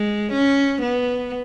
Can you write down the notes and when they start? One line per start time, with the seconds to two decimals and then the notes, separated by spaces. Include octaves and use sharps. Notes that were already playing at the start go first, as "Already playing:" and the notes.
Already playing: G#3
0.32 C#4
0.82 B3